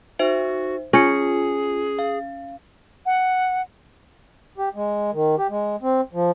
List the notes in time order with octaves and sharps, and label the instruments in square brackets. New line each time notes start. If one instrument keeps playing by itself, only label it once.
[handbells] D#4 C5 E5 [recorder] F#4
[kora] C#4 [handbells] F4 C#7 [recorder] G#4
[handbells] F5
[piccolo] F#5
[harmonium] G4
G#3
D#3
G4
G#3
C4
F3